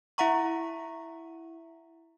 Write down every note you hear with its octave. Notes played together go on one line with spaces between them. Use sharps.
E4 E5 F#5 A#5 C#6